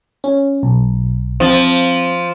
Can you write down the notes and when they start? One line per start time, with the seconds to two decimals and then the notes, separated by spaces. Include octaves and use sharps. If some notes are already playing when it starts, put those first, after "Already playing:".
0.24 C#4
0.63 B1
1.40 F3 C4